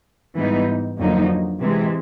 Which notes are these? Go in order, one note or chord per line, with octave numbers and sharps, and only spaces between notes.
G#2 E3 G3 B3 D#4
F2 D3 F#3 A#3 D#4
C3 E3 G#3